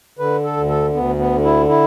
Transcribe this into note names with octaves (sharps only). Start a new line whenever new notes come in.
D3 B4
A4
D2
A4
D2 B3
B3
D3
E4
E4